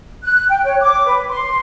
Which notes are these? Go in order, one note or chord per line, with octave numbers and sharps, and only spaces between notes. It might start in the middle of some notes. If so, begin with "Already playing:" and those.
F#6
G5
C#5
D6
B4
C6